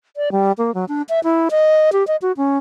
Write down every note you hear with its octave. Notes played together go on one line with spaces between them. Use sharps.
D5
G3
A#3
F#3
D4
E5
E4
D#5
G4
D#5
F#4
C#4